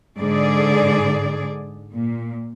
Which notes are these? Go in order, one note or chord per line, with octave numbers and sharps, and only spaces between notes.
G#2 D3 G#4 D5
A#2